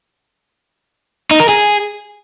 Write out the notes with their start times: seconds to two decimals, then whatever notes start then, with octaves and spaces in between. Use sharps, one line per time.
1.31 D#4
1.40 A#4
1.49 G#4